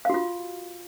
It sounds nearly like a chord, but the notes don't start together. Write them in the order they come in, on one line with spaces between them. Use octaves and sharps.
F5 F#4 F4